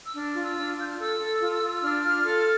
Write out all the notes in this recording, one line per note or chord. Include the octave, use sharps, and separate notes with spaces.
E6
D4 F6
F4
E6
D4
F6
F4 G6
F6
A4 E6
A4
F4
F4
D4 F6
F4 F6
A4 F6